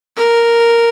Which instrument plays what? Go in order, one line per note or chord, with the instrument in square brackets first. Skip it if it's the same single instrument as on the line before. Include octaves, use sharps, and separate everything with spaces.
[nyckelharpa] A#4